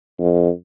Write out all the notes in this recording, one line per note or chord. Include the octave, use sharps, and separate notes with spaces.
F2